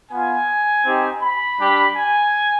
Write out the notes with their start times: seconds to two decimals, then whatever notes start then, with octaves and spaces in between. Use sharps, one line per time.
0.11 B3 F4 G#5
0.85 C4 D#4 G4
1.22 B5
1.59 G3 D4 G4
1.95 G#5